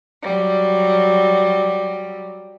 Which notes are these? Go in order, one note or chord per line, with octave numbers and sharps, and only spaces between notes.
F#3 G3